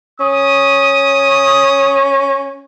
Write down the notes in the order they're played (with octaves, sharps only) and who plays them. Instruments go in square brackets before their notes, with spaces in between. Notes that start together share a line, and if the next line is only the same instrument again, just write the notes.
[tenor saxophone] C#4 [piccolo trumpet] D#6